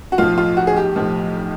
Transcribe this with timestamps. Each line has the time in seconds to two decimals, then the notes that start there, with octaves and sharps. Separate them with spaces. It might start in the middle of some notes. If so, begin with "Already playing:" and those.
0.12 F#4
0.18 B1 A2 F3 F4
0.38 F4
0.57 F#4
0.67 G#4
0.76 G4
0.96 B1 A2 F3